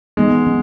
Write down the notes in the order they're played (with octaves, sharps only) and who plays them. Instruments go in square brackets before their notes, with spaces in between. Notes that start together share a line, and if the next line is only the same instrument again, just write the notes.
[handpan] E3 B3 D#4 [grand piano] G#3
[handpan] F#3 C#4